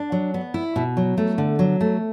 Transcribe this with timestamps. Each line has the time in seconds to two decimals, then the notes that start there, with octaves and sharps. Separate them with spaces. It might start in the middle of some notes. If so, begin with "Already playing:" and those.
Already playing: D4
0.12 F#3
0.34 B3
0.54 E4
0.76 B2
0.97 F#3
1.18 A3
1.38 D3
1.59 F#3
1.81 A3